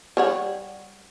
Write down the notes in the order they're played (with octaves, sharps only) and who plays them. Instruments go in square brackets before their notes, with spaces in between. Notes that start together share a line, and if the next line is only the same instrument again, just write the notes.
[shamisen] G3 C#5 F#5